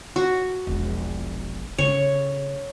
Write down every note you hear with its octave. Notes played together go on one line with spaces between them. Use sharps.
F#4
E1 A#1
C#3 A3 C#5